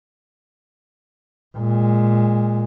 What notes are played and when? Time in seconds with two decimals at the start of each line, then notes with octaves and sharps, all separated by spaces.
1.57 A#2 G#3